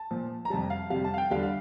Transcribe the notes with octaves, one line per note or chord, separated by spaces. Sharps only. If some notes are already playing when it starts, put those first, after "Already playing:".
Already playing: A5
A#2 F3
A#5
F2 C3 G3 A5
F5
F2 C3 G3 F5
A5
F5
G5
E2 D3 G3 F5
F5